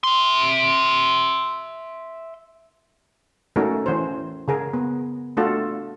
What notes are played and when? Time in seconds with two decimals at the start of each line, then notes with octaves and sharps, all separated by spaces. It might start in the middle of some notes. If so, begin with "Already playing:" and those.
0.04 E5 C6
3.56 A3 C#4 D#4 F#4 A4 A#4
3.86 E3 C#4 C5
4.48 C#3 G#4 A#4
4.73 B3
5.37 A3 D4 F4 F#4 A4